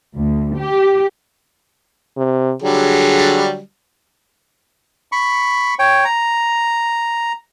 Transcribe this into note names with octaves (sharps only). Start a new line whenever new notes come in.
D2
G4
C3
D3 F#3 G3 G#4
B5 C#6
C#5 G5
A#5